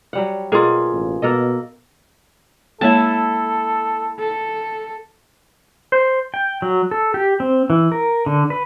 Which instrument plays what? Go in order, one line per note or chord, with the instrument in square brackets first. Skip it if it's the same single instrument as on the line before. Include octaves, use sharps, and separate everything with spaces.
[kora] F#3 G3 F#5
[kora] B2 A#3 [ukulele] F4 G#4
[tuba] A1
[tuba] B2 [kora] A#3 A4 D#5
[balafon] G#3 A#3 C#5 [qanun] E4 A5 [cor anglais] A4
[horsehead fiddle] A4
[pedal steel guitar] C5
G5
F#3
A4
G4
C4
E3
A#4
D3
B4